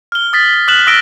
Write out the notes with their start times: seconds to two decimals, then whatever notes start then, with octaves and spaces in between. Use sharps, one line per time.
0.12 F6 G7
0.33 D#6 A6 B6
0.68 D#6 F6 F#6 E7 F#7
0.87 D#6 E6 A#6 D7 G7